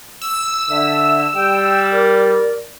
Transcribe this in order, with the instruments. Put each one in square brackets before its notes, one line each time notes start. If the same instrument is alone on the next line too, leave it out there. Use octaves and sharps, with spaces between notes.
[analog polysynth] E6
[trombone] D3 [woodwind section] E5
[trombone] G3 [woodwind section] G5
[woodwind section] A#4 D5